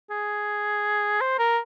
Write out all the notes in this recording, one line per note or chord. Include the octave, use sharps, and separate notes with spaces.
G#4
C5
A#4